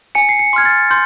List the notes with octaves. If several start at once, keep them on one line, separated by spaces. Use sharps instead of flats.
G#5 C#7
C7
C#7
C6 F6 G#6
A6
C6 G6